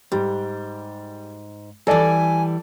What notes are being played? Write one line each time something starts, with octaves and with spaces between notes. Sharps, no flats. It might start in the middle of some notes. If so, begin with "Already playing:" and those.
G#2 G3
E3 G3 A4 D5 G#5